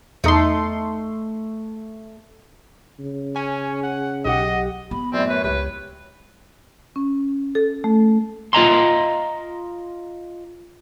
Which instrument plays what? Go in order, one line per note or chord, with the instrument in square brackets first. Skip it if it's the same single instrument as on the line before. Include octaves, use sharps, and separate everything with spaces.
[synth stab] E2 D#4 C6 [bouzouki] A3 A5
[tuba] C#3
[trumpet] C#4 [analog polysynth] G#5
[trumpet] F#5
[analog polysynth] B1 G4 F#5 [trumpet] D#5
[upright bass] B3 [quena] B5
[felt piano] F#2 A2 [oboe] C4 [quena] D5
[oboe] B4 [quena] C#5
[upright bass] C#2 [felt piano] G4 [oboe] B4
[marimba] C#4
A4
A3
[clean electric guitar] F4 D#5 A#5 C6